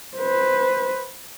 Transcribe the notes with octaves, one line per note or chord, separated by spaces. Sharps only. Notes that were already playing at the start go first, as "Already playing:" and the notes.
B4 C5